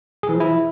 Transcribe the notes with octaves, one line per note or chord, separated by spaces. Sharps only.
G#4
E3
F3
E4